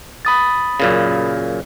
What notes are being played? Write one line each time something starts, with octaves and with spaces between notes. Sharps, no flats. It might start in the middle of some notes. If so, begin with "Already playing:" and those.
B5 D#6 A6
F#2 A#2 C#3